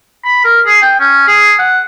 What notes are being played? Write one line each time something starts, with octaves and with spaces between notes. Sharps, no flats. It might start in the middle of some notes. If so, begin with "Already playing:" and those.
B5
A#4
G#4
G5
C#4
G#4
F#5